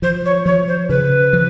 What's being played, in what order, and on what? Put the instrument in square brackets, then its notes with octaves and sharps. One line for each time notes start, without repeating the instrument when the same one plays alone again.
[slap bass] F3 [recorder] C5
[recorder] C#5
[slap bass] F3 [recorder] C#5
[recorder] C5
[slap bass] C#3 [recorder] B4
[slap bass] F3